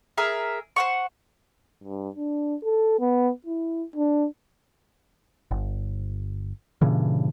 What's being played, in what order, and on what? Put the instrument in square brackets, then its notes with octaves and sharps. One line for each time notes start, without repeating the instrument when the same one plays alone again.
[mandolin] G#4 A#4 E5
C5 F#5 C#6
[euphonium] G2
D4
A4
B3
E4
D4
[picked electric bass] G1
G2 A#2 C#3 E3